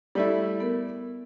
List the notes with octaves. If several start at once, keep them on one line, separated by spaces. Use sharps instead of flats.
G3 A3 E4
B3 A#4